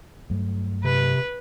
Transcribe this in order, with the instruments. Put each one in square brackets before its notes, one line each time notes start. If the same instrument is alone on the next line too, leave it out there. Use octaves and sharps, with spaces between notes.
[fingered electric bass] G2 F#3 A3
[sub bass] C3 [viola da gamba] B4